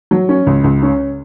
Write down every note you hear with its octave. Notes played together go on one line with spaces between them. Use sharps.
F#3
C#4
C#2
C#2
C#4